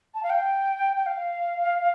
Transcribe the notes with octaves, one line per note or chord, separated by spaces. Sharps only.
A5
F5
G5
G5
F5